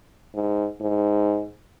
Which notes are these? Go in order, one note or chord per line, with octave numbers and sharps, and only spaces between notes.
G#2
G#2